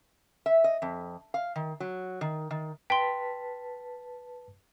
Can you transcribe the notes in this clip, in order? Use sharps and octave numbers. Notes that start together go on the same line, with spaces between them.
E5
D#5
F2
F5
D#3
F#3
D#3
D#3
B4 G5 A5 C6 B6